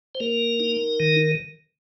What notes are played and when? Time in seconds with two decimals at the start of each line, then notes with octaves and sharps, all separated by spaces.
0.15 C5
0.20 A#3 A#4
0.60 D#4
1.00 D#3